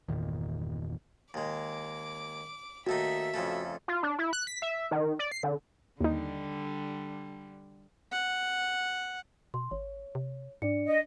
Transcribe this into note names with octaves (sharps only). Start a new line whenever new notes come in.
G1 E2 A#2 D#3
D#2 G#3 D6
D#2 A3 D#4 F#4 E5
F2 C#3 A3
F4
D4
E4
F#6
B6
E5
D#3
D5
C7
D3
D#2 D3 G3 D#4
F#5
B2 C6
G#1 C#5
C3
G#2 D4 D5 C#7
D#5